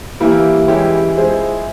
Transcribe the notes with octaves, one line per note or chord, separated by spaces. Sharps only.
E3 G3 A#3 E4
E3 G#3 C#4 E4 G4
F3 G#3 E4 G#4 C5